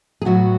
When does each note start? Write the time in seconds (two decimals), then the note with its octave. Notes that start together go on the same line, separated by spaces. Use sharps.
0.22 G#4
0.25 A2 F#3 B3 F#4